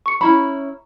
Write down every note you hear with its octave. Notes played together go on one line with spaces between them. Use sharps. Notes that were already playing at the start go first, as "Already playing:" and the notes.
C#6 C#7
C#4 E4 A#5 B5